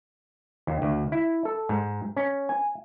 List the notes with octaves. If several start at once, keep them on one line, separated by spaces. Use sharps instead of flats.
D#2
D2
E4
A4
G#2
C#4
G#5